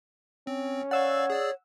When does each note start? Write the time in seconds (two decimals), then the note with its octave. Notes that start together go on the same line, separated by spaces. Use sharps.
0.47 C4 C#4
0.91 C#5 D5 F5 F#5 C#6 E6
1.30 G#4 D5